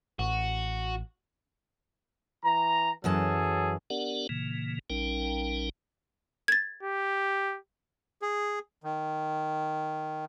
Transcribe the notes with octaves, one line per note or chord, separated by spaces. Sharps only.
A1 F#4
E3 A#5
F#2 E3 F#3 G#4 A4 A5
B3 D4 G4 A#4 D5 F#5
A#2 C#3 E3 A#3
A#1 G3 C#4 D#4 A#4 G5
G#6 A6
G4
G#4
D#3